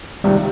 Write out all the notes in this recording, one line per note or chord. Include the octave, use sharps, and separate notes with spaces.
C#2 C3 D#3 G3